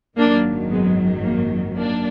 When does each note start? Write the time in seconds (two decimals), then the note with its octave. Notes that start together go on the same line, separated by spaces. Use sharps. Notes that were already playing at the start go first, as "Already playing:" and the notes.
0.18 G#1 F#2 D#3 F#3 A#3 D4
0.71 G#3 B3
1.24 A#3
1.76 A#3 D4